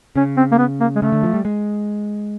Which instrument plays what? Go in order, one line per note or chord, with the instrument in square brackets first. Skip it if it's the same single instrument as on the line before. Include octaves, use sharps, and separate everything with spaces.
[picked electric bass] C#3 [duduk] C#4
[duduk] C4
A#3
B3
A#3
G#3
[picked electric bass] C#3 [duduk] A3
[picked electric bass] D3
F3
G3
G#3